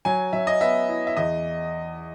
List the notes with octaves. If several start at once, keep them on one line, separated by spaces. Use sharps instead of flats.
F#3 G#5
F#3 E5
D#5
B3 E5
E4
E5
E2 D#5